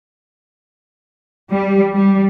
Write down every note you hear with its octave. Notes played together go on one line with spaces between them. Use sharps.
G3
G3